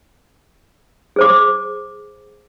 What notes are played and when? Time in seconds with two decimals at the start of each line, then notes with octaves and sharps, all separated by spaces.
1.16 G#4 C5 D6